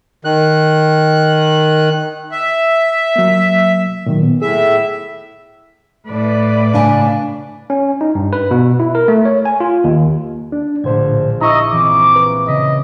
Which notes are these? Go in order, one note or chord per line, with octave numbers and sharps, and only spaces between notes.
D#3 F#6
E5
F#3 A#3
A#2 D#3 F#3
B3
A2 G#4 E5
A2 B4 D5
C#3 D4 G#5
C#4
D#4
G2
B4
B2
E4
A#4
A3
C#5
G#5
F4
D#2
D4
A#1 A2 D3 C5 G#6
E4 D#5 A#5 C#6 E6
E3 C4 D6
B4
C#3 D#5 B6